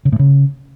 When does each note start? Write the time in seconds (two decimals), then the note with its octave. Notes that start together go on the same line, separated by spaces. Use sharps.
0.05 C#3
0.12 A2
0.19 C#3